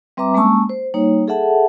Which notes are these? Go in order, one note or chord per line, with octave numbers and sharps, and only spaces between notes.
G3 C4 B4 E5 A#5 D6
G#3 A#3 C#4 A5 C#6 E6
C5
G3 A#3 D#4 C#5
G#4 A4 E5 F#5 A5